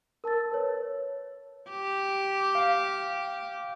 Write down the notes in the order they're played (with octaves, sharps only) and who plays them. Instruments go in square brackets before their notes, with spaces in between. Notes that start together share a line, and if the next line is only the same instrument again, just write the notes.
[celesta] A#4 A5 E6 A6
B4 C#5
[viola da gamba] G4
[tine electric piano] F5